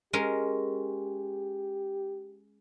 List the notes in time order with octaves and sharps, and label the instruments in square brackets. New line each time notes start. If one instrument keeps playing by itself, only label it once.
[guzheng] G#3 C#4 A#4 [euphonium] G4